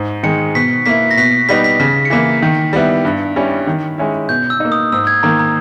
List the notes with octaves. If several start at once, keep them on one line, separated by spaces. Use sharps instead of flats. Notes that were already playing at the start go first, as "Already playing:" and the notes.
Already playing: G#2
D#3 G#3 C#7
B2 B6
A#3 E4 B6
A#6
B2 B6
G3 B3 D#4 B6
B6
C#3 B6
C#7
E3 A#3 E4 B6
D#3
G3 B3 E4
G2
G3 C#4 E4
D#3
G#3 C#4 E4
B2 G6
E6
A#3 D#4
D#6
G#2 E6
G#6
D#3 A#3 A#5
A#5